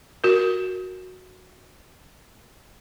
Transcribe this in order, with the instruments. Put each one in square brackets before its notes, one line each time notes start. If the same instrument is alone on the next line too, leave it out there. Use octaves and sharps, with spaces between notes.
[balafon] F#4 A#4